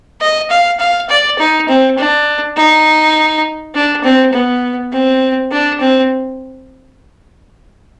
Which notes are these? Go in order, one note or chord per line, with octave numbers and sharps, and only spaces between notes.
D#5
F5
F5
D5
D#4
C4
D4
D#4
D4
C4
B3
C4
D4
C4